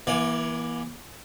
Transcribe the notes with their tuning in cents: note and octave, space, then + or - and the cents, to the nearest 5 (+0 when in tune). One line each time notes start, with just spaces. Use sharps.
E3 +0 A#3 +45 D5 +0